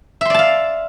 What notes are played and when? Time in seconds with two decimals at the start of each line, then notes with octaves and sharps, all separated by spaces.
0.21 E5
0.25 C6
0.30 D5
0.34 A5
0.39 F5